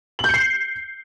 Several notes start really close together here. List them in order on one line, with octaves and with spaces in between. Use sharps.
F#7 G6 C#7 C7